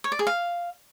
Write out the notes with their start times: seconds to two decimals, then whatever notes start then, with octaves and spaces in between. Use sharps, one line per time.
0.04 C#5
0.12 D5
0.19 G#4
0.27 F5